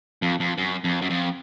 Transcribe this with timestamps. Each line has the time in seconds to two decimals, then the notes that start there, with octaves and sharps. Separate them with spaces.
0.22 F2
0.40 F2
0.58 F#2
0.84 F2
1.02 F#2
1.10 F2